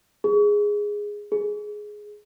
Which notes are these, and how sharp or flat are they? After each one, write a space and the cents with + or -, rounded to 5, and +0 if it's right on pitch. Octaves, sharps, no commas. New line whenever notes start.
G#4 -5
G#4 +10